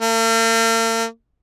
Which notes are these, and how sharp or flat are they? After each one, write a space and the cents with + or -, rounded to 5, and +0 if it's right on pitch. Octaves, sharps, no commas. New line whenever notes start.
A#3 -45